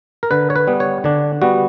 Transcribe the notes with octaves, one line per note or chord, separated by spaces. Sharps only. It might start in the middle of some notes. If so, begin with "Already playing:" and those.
A#4
D3 B4
C#5
B4
G3 B3
C#5
D3 D4
G3 B3 F#4